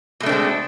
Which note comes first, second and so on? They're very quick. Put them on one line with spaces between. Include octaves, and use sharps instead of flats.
B2 A3 D4 C4 G#3